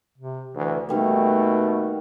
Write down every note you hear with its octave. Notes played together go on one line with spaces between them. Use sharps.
C3
D2 E3
B2 D#3 G3 A3 A#3